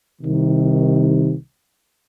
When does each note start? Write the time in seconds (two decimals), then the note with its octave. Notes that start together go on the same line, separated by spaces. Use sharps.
0.22 C2 C3 D#3